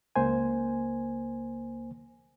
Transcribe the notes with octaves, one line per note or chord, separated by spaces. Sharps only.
C#2 A#3 C5 G#5